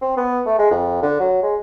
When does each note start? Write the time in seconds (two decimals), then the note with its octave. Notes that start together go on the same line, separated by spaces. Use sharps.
0.02 C4
0.17 B3
0.46 A3
0.58 G#3
0.71 F2
1.02 D3
1.20 F#3
1.43 G#3